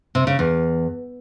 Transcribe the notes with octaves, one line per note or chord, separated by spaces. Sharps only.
C3
C#3
E2